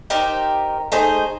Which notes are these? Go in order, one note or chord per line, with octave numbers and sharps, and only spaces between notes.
D#4 G4 A#4 C5
A3 D#4 G#4 C5